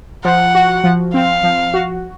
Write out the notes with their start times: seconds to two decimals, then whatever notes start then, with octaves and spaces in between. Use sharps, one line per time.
0.25 F3 F#5
0.55 F#4
0.84 F3
1.14 C4 F5
1.43 F3
1.74 F#4